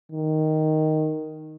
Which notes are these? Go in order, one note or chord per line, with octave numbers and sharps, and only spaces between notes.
D#3